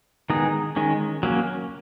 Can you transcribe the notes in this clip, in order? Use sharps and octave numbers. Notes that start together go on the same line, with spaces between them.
D#3 G#3 B3 D#4 G#4
D#3 G#3 C#4
F#3 A#3 C#4